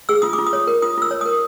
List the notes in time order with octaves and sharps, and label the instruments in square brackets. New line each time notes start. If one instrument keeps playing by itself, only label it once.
[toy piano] G#4 E6
F4 D#6
D6
F4
D#6
C#5
A#4
F4 D#6
F4 E6
C#5
A#4 D#6